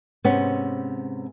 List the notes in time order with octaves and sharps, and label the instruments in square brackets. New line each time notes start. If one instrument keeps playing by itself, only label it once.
[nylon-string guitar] G#2 C3 B3 C#4